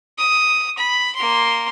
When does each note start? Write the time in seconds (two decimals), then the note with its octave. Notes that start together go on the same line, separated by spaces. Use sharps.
0.18 D#6
0.78 B5
1.15 A#3 C6